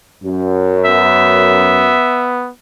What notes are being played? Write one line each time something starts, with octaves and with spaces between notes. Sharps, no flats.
F#2
B3 E5